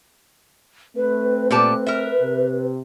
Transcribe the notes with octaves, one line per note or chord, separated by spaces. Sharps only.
A3 C4 B4
A#2 G4 B4 A5
A#4 E5
C3